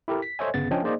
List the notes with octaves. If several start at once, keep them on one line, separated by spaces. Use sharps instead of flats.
E4 G4 A4 A#4
B6
A4 C5 C#5 D#5 E5 G#5
G1 C#3 B3 A6
F3 C#4 D4 D#5 G5 G#5
A#3 D#4 G#4 C5 D5 D#5